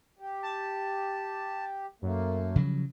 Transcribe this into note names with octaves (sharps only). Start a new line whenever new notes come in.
G4
A5
F#2 A3 A#3
C#3 F3 F#3